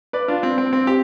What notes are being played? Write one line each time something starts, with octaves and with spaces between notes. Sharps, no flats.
B4 D5
D4 F4
C4
C4
C4
G4